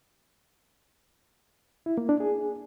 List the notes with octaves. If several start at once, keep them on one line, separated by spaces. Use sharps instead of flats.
E4
A#3
D4
G#4